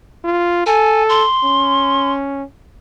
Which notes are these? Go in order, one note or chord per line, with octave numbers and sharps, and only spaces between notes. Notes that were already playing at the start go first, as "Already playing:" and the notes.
F4
A4 G#5
C6
C#4